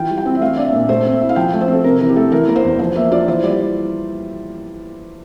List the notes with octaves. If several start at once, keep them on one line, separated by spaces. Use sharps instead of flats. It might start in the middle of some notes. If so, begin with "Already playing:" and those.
Already playing: E3 F4 G5
G3
G5
C4
E5
A3 F5
D4 D5
E5
A#2
A3 C5
C4
E5
E4
F5
F3 G5
A3
C5
C4
A4
C3 A#4
E3 A#4
G4
A3 A4
E3 A#4
A#3 A#4
C5
E2
F3 C5
A#3 E5
F4 D5
E3 C5
G3 D5